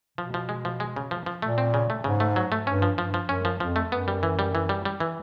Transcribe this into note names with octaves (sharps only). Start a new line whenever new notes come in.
B2 F3
F3
G#3
F3
G#3
C#3
F3
F3
A#2 A3
C4
C#3
A3
G#2 C#3
A3
F#3
A3
G2 C#4
F3
G2 F3
F3
F#2 C#4
F3
F2 F3
A3
F#2 B3
G3
E3
G3
E3
G3
G3
E3